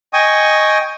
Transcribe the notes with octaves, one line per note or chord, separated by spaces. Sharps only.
D#5 G5 G#5 C#6 D#6